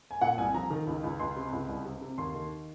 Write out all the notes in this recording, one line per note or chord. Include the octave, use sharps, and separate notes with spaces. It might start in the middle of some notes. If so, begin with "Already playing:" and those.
G#5
A#2 F#5
C2 G#5
F3 A#5
D#3
C#2
C#2
C#2 C6
C3
C#2
C2
C3
C3
D#2 C6
D#3